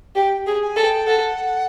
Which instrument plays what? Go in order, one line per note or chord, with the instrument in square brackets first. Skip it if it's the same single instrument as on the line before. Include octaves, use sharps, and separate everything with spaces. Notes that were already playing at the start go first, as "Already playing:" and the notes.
[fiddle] G4 [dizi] G5
[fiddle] G#4
[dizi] G#5
[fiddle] A4
[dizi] G5
[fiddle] A4 [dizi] F#5